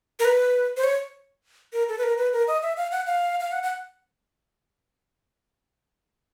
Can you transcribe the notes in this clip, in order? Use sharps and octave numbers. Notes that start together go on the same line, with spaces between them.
A#4
B4
C5
C#5
A#4
A4
B4
A#4
B4
A#4
D#5
E5
F5
F#5
F5
F5
F#5
F#5